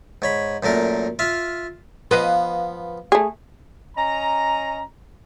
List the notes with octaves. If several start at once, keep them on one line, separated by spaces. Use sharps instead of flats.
G#2 C#5 B5
F#2 A#2 A3 A#4
F4 E5 F5
F3 B3 B4 D#5 F5
A3 G#4
C#4 D#5 A#5